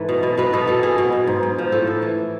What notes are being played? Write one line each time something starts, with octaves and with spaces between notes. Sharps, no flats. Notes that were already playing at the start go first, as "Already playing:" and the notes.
Already playing: G#2 E3 A4 B4
B2
B2
B2 B4
B2 A4
B2 A4
B2 G#4
B2
B2
G#2
G#2
F3
A2 A4
A2
E3